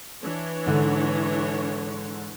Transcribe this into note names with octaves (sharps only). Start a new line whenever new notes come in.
E3 D4 C#5
G#2 D3